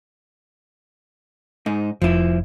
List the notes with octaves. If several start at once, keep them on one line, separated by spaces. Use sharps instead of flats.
G#2 D#4
F1 F3 E4